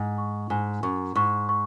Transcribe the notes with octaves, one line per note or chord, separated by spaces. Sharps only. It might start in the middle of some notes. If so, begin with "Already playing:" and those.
Already playing: G#2 G#5
C#6
G#2 G#5
F#2 C#6
G#2 C#6
C#6